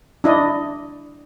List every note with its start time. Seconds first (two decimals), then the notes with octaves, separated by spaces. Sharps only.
0.24 D4 E4 D#5